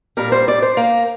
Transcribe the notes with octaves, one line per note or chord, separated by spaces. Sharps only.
A#2 G3 A#4
C5
D5
C5
A#3